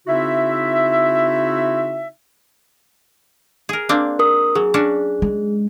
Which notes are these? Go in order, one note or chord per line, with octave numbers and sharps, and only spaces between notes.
C#3 C4 D#4 E4 F#4 E5
G#4 A#4
A#3 C4 D4
A#4 D#6
F#3 G#4
C#4 D4 F#4
G#3